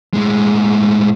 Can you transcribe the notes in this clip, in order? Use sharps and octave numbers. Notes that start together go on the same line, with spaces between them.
A2 G#3